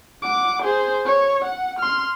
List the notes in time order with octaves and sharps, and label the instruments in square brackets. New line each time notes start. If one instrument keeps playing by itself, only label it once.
[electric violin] F#5 D6
G#4 C5
C#5
F#5
C6 F6